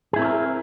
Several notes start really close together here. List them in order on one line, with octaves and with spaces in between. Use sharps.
G#4 E4 C4 C#5 A#4